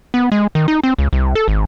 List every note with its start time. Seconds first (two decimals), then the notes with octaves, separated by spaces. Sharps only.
0.14 B3
0.32 G#3
0.55 D#3
0.68 D#4
0.83 C4
0.99 C#2
1.13 C2
1.35 A4
1.48 G#1